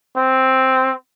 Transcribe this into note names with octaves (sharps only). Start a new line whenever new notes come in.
C4